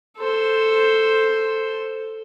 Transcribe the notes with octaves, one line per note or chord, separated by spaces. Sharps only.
A4 C5